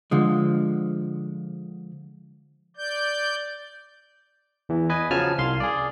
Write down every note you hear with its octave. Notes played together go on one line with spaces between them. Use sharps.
D3 F3 G#3
D5 G6
E2 E3
B4 D#5 G#5
C#3 F3 F#3 G#5 A5 F6
C2 F5 C6
G#4 D5